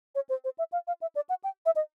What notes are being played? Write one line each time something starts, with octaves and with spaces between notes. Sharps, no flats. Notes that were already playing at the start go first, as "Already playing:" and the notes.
C#5
C5
C5
E5
F5
F5
E5
D5
F#5
G5
E5
D#5